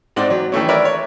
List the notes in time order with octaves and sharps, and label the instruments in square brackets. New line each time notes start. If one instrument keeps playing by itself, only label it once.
[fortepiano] G#2 C4 D5 F#5 C6
F#3
D#3 E3 A3 C#4
A#4 B4 C#5 D5 E5
C#5